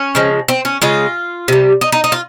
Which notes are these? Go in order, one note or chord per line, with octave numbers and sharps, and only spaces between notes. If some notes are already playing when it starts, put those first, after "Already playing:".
Already playing: C#4
C#3 F3 G#3
C4
C#4
C#3 G#3 F4
C3 G3
D#4
D#4
D#4
F4